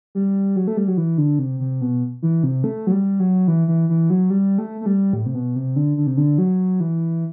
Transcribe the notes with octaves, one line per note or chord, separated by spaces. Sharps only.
G3
F#3
A3
G3
F#3
E3
D3
C3
C3
B2
E3
C3
A3
F#3
G3
F#3
E3
E3
E3
F#3
G3
A3
A3
G3
A2
C3
B2
C3
D3
D3
C3
D3
F#3
E3